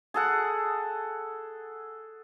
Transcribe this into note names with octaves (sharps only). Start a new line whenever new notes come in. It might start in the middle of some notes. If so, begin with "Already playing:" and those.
G#4 A4 F#5